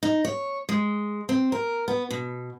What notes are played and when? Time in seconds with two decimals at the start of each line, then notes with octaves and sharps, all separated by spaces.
0.03 D#4
0.25 C#5
0.69 G#3
1.29 C4
1.52 A#4
1.88 B3
2.11 B2